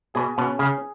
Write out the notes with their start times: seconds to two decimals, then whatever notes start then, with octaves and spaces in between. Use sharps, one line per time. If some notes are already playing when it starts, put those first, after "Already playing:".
0.15 B2 G#4
0.38 B2 C#4
0.59 C#3 G#4